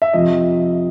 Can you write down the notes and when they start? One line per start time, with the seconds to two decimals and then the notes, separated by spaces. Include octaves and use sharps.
0.02 E5
0.13 F2 C3 F3 D#5